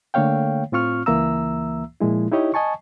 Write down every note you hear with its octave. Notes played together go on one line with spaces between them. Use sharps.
D3 A3 A#3 C#5 F5 G5
A2 C4 F4 C#6 F6
C#2 E3 A#3 E5 A#5 E6
A#2 F3 G#3 E4
D#4 E4 G4 C#5 D#5
D#5 G#5 A5 C#6